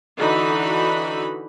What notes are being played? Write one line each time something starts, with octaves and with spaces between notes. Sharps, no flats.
D3 E3 D#4 F#4 B5